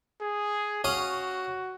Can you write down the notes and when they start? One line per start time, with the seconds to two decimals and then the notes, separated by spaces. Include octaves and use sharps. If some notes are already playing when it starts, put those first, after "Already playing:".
0.22 G#4
0.84 C#4 F#4 F5 D#6